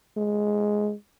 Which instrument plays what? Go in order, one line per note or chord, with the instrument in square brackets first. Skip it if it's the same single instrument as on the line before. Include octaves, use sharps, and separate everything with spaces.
[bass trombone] G#3